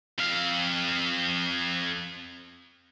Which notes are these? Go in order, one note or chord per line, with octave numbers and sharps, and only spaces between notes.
F2 F5